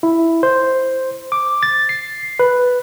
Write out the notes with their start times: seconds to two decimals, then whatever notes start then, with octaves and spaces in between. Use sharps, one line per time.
0.03 E4
0.43 C5
1.32 D6
1.63 A6
1.89 C7
2.39 B4